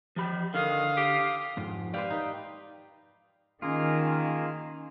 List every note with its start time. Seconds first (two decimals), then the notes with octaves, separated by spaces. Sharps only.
0.16 F3 G4 B5
0.54 D3 D#3 F5 D#6
0.97 G4
1.57 F2 G#2
1.94 G4 B4 C5 D5 F5
2.10 D#4 B4
3.62 D#3 A#3 C#4 F4 G#4 A#4